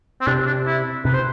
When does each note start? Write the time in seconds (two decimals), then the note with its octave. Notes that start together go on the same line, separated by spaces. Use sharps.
0.21 C4
0.27 C3 D4
0.47 D4
0.67 E4
1.05 C3 B4
1.13 C5